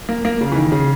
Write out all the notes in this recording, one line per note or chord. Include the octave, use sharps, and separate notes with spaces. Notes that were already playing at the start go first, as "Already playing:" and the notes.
A#3
A#3
C#3
E3
D#3
C#3